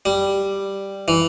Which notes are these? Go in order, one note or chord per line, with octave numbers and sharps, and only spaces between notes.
G3
E3